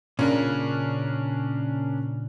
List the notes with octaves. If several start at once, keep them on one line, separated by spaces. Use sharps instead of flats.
A#2 C#3 C#4 D4 A#4